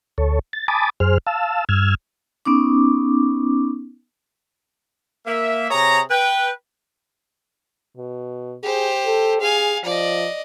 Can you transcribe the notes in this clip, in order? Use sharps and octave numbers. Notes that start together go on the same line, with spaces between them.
D2 A4 C#5
A6
G#5 A5 B5 D6 D#6 A6
F#2 G#4 C5 F6
F5 A5 E6
G2 E6 F6 G#6
B3 C#4 D#4 D6
A#3 E5
C3 G#4 C#5 A#5
B4 G5
B2
G4 G#4 C5
A4
G#4 F5 G#5
F3 D5 D#5